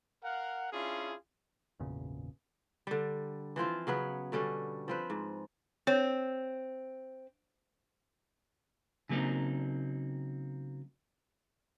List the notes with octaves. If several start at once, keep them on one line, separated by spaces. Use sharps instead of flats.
A#4 F5 F#5
C#4 D4 E4 F4 G#4
G#1 E2 A#2 C#3
D3 G3
E3 F3 C4 F4
C#3 F#3 B3 B4
B2 D3 G3 C#4
F3 C4 B4
G#2
C4 C#5
C#3 F#3 A#3 C4 D#4